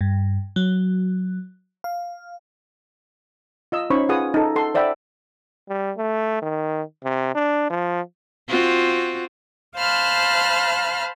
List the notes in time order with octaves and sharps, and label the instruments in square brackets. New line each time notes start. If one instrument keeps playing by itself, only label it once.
[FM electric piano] G2
F#3
F5
[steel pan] F4 D#5 E6
C#4 D#4 C5 C#5 B5 C#6
F4 G#4 B4 F#5 G#5 D#6
D#4 A4
A4 F#5 C6
C5 D5 E5 F#5 G5 B5
[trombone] G3
A3
D#3
C3
D4
F3
[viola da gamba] C4 F4 F#4
[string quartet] C5 F5 A5 B5 F6 F#6